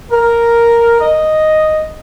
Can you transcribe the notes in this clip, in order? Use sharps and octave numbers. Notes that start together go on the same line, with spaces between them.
A#4
D#5